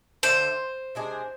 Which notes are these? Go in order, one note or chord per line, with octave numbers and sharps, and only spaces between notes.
D3 A3 C4 C5
C3 G#3 D4 G#4